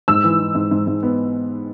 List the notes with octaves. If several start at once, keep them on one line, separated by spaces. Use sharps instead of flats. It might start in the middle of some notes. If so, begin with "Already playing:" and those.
G#2 E6
E3
E3
G#2
G#2
G#2
B3